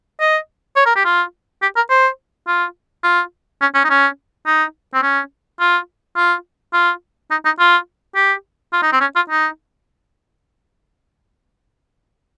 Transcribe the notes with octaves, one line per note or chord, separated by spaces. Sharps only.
D#5
C#5
A#4
G4
F4
G4
A#4
C5
F4
F4
C#4
C#4
D#4
C#4
D#4
C4
C#4
F4
F4
F4
D#4
D#4
F4
G4
F4
D#4
C4
C#4
F4
D#4